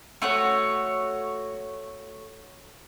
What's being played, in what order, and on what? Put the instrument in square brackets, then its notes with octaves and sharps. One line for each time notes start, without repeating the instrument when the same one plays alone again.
[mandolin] A3 F#4 C#5